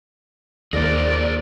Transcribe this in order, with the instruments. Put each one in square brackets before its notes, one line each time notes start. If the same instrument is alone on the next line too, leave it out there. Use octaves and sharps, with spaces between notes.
[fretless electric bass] D#2 [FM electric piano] A#3 A#6 [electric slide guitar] G#4 A#4 C5 [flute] D5